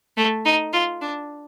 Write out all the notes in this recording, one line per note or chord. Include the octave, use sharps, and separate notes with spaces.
A3
D#4
F4
D4